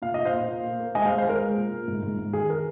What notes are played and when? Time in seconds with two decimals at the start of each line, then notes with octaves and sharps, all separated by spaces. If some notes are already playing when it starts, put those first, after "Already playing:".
0.02 A#2 F5
0.14 A#2 D#5
0.25 C5 F5
0.33 A#2
0.48 A#2
0.64 A#3
0.80 A#3
0.95 G#3 D#5 G#5
1.06 C5 F5
1.11 G#3
1.18 C5 F5
1.25 G#3 A#4
1.42 G#3
1.56 A#2
1.72 A#2
1.88 G#2
2.03 G#2
2.19 G#2
2.33 D#3 G#4
2.50 A#4